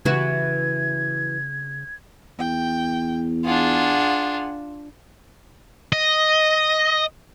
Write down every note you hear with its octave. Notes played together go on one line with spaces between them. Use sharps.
C#3 E3 F#4 G#6
E2 G5
D4 F4 G#4 F#5
D#5